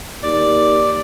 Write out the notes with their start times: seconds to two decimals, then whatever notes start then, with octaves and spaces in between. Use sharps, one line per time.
0.23 D#2 D5